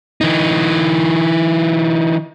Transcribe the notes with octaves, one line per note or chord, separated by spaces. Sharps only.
E3 D#4